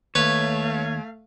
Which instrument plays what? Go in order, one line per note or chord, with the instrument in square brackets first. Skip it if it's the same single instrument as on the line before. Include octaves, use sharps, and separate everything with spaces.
[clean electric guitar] D#2 [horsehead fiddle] A3 F5 [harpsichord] B4 [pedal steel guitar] C#5